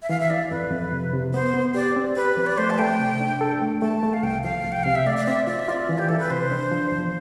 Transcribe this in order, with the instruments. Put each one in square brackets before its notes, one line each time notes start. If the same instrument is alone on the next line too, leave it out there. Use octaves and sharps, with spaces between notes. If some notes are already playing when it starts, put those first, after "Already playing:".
[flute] E5
[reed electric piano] E3 [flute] F5
[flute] E5
[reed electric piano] E4 [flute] D5
[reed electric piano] F2 [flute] B4
[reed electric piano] F2
C3
C3
[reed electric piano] B3 [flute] C5
[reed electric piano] B3
[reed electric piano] G4 [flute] D5
[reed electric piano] C4
[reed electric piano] G4 [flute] B4
[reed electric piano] F3
[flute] D5
[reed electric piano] A3 [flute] C5
[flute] A5
[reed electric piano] A3 [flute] G5
[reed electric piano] C3
D4
A4
A3
[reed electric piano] A3 [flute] A5
[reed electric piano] A3
[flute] F5
[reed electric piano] C2 [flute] G5
[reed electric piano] F3 [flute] F5
[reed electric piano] C2
[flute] G5
[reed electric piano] C3 [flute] F5
[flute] E5
[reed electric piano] A3 [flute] D5
[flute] D5
[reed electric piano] C4 [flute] E5
[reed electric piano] F4 [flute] D5
[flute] E5
[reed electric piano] F4 [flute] D5
[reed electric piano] E3
[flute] G4
[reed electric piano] E3 [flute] A4
[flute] B4
[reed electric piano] C3 [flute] C5
[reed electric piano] D4
F3
E2